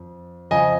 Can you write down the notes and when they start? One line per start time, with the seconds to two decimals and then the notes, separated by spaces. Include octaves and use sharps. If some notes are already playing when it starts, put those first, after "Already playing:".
Already playing: F2
0.51 F2 C#3 F3 D#5 G#5